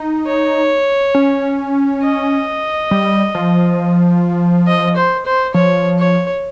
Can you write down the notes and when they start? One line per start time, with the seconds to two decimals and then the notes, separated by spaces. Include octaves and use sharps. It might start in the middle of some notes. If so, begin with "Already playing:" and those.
Already playing: D#4
0.27 C#5
1.15 C#4
2.03 D#5
2.91 G3
3.35 F3
4.67 D#5
4.96 C5
5.26 C5
5.54 F3 C#5
5.99 C#5